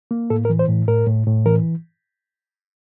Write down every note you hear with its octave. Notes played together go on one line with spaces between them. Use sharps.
A#3
A2 A4
A#4
E3
C5
A2
A2 A#4
A2
A2
E3 A#4